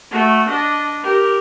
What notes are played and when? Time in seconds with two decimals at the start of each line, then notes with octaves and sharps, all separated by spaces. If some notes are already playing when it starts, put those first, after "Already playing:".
0.11 A3 F#4
0.49 D4 D#5
1.04 G4 A#4